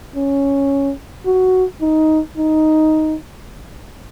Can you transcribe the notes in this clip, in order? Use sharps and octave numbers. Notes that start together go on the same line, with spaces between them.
C#4
F#4
D#4
D#4